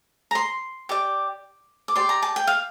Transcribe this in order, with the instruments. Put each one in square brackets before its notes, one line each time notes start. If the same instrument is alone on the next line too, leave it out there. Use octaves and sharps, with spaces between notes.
[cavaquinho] A#5
C6
G4 D5 D6
D6
G4 D5 C6
A#5
A5
G5
F5